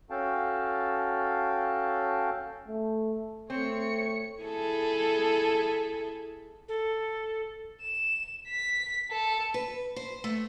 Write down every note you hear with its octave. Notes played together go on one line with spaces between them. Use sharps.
C#4 F#4 A4 F5 G5 A5
A3
A3 C4 C#5 C#7
E4 G#4 A4
A4
E7
B6
A4
B4
C5
A3